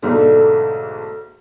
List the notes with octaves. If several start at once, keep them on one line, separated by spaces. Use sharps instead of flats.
B1 G#2 D3 A3 D4